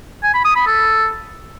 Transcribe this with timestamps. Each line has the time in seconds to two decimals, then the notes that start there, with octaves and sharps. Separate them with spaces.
0.23 G#5
0.34 B5
0.45 D#6
0.56 B5
0.67 A4